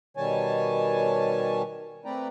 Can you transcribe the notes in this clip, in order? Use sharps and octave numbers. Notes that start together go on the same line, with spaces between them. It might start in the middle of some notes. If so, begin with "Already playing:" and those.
B2 D#3 G3 C#5 G#5 A5
A3 C4 B4 D5 G5 A#5